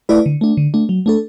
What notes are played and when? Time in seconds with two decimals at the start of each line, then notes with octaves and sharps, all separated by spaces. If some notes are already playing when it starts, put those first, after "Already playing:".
0.09 A3 E4 B4 D5
0.26 D3
0.41 A3 D4
0.57 D3
0.74 A3 D4
0.89 F#3
1.06 A3 D4 A4